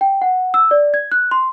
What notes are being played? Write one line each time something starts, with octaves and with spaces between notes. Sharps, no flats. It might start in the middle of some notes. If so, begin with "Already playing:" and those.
G5
F#5
E6
D5
G#6
F#6
C6